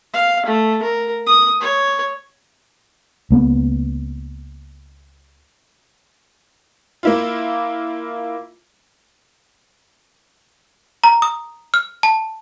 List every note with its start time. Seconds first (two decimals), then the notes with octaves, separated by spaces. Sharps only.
0.13 F5
0.46 A3
0.82 A#4
1.26 D#6
1.61 C#5
3.31 C#2 A#3 B3
7.03 A#3 E4 F4
11.04 A#5
11.22 D#6
11.74 F6
12.03 A5